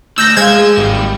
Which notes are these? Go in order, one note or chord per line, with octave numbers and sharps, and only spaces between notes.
D2 E6 G6 A#6
G#3 C5 F5 G#6 E7
G#1 G3 G#3